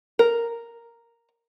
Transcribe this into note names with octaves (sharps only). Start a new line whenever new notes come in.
A#4